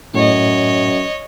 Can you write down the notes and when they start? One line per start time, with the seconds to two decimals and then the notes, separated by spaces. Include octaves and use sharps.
0.14 F#2 A2 C#5 D#5